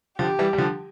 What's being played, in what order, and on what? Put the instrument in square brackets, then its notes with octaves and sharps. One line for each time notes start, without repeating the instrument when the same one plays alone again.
[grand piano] D3 F3 [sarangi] G4
[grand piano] E3 G3
G3
D3 F3